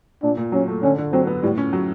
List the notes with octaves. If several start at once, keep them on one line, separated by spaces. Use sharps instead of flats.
A#2 D4
A#2
F#3 C#4
A3
D3 C#4
D3
F#3 C4
B3
A2 G3
C#4
F#3